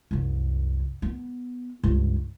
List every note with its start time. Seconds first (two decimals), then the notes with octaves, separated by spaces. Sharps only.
0.11 C2 F#2
1.02 B3
1.83 C#2 G2